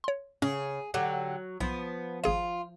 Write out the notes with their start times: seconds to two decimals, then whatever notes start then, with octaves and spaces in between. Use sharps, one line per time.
0.04 C#5 C6
0.42 C#3 C#4 G#4
0.94 D3 F#3 F#4 G4
1.60 B1 F3 B3
2.24 G#1 F4 G#4 D#7